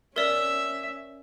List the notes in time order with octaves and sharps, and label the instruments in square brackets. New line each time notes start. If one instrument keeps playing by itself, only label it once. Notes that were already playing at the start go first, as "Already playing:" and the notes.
[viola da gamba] C#4 [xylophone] A#4 D5 [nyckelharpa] E5